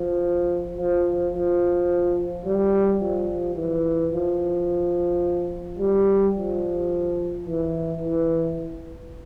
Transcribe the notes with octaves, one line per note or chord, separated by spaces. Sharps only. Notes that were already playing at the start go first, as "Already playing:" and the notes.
Already playing: F3
F3
F3
G3
F3
E3
F3
G3
F3
E3
E3